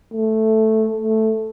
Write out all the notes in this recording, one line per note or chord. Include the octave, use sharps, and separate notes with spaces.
A3
A3